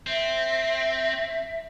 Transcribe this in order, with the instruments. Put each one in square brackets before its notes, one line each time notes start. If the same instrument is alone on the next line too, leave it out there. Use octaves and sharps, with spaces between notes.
[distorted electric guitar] C4 [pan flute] E5